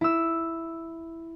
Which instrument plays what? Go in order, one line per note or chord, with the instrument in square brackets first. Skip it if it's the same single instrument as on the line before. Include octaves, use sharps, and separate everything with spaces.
[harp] E4 E6